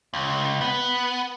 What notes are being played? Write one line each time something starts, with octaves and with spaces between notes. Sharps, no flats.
C#2
B3